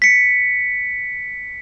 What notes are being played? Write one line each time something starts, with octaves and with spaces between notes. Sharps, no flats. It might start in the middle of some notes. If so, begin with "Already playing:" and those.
B6 C#7